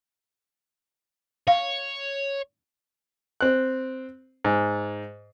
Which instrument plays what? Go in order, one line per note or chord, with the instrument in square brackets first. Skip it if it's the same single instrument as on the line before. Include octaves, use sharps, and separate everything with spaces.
[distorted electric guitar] C#5 [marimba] F5
[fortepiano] C4 F#6
G#2